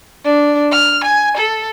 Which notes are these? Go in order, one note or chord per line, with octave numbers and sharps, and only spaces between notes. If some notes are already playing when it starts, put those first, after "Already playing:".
D4
F6
G#5
A4